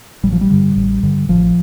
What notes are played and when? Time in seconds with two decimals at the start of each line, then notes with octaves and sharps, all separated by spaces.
0.23 A1 G3
0.33 F3
0.41 G3
0.50 G2 D3
0.76 A1
1.03 G2 D3
1.29 A1 F3